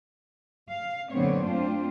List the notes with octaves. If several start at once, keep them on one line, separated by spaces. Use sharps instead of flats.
F5
F#2 A#2 D3 B3 C4 C#5
A3 C4 D4 F4 C5